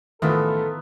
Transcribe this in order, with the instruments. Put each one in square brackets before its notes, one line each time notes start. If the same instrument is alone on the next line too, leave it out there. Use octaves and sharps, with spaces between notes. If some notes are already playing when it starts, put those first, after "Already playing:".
[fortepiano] A1 [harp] D#3 [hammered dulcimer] B3 F4 E5 [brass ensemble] A4